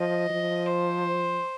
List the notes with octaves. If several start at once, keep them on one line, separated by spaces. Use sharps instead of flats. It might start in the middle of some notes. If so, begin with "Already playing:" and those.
Already playing: F3 D#5
F3
C5